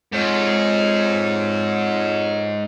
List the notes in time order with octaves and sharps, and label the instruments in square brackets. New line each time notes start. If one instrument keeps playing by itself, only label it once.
[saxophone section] F2 C#5 [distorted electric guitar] G#2